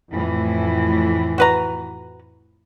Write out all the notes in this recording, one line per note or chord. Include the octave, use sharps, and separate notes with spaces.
F2 A2 E3
F#4 B4 A#5